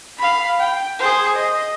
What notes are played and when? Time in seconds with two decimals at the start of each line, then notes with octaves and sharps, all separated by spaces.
0.18 F5 B5
0.60 G5
0.99 G#4 C5
1.36 D#5